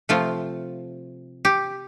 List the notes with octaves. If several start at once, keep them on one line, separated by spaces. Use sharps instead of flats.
C3 F3 A3 F4
G4